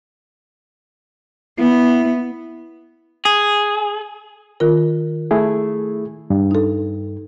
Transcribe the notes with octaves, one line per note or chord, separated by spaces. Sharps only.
B3 E4
G#4
D#3 F4 A#4
A3 E4 G#4
G2
D#4 A4